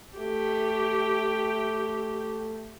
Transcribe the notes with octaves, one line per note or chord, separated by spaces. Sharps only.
A3 G4